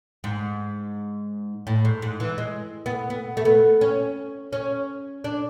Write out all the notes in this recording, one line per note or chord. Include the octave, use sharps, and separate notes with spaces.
G#2
A2
G#2
G#2
E3
G#3
B3
B3
A3
B3
C#4
C#4
D4